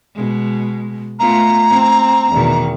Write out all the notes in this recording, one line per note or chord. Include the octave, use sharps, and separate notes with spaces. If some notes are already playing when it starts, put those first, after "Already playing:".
B2 G#3
A3 B3 F4 A#5
C4
E2 B2 D#3